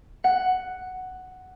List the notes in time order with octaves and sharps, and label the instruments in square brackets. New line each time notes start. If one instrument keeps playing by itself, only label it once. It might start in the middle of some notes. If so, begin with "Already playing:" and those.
[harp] F#5